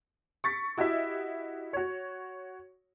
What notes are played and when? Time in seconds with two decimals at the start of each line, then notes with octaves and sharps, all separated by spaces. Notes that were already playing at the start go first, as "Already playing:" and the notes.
0.44 C#6 A6 B6
0.77 E4 F#4 G4 D#5 E5
1.73 F#4 C#5